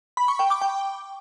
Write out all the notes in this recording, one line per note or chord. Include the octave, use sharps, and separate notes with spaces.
B5
C#6
G5
D6
G5